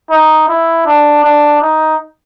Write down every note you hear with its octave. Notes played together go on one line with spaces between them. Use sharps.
D#4
E4
D4
D4
D#4